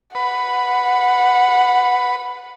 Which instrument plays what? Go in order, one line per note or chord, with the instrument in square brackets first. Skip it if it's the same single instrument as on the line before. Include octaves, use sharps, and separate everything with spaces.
[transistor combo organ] B4 [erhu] F#5